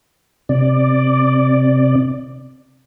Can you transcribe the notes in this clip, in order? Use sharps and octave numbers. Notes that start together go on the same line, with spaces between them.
C3 D5